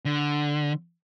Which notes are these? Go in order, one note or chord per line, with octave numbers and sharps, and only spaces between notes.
D3